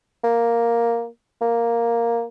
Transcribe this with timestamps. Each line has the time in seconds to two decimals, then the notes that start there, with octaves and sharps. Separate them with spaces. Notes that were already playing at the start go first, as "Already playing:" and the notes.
0.24 A#3
1.42 A#3